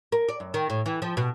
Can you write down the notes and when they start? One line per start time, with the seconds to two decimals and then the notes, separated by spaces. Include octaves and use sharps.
0.12 A#4
0.29 D5
0.40 F#2
0.54 D#3
0.70 A2
0.86 E3
1.02 F3
1.17 B2